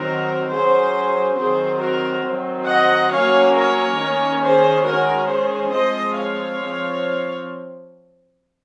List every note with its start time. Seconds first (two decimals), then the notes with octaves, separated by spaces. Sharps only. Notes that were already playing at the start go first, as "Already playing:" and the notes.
Already playing: D#3 F#3 C4 F#4 A#4
0.50 F#3 C#4 G#4 C5
1.38 D#3 F#3 C4 G#4 C5
1.81 F#4 A#4
2.25 D#3 F#3 C4
2.68 D#5 F#5
3.12 F#3 A#3 C#4 C#5 F5
3.55 A#4 C#5
3.99 D#3 A#3 C#4
4.42 G#4 C5
4.86 D#3 G#3 C#4 F#4 A#4
5.29 G#4 C5
5.72 F3 G#3 C4 C5 D#5
6.16 C#5 F5
6.60 F3 C4